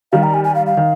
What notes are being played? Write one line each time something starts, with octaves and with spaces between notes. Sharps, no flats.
D#3 G3 F5
A#5
G#5
G#5
F5
F5
D#3